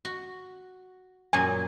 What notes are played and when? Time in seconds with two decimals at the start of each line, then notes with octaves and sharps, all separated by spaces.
0.05 F#4
1.33 F#2 A#2 F#3 G#5